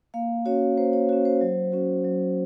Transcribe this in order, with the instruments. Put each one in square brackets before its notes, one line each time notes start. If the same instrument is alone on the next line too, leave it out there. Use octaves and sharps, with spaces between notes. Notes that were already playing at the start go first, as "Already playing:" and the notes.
[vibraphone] A#3 F5
C#4 F#4 C#5
A#3 C5
C#5
C#4 F#4 C#5
C5
F#3
C#4 F#4
F#3